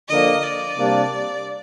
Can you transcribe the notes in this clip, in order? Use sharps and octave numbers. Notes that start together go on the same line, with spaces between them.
D3 F3 A#3 D4 D#5
D5
C3 G3 A#3 D4